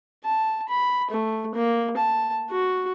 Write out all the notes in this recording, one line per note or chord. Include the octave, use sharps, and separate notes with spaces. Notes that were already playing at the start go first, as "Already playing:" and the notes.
A5
B5
A3
A#3
A5
F#4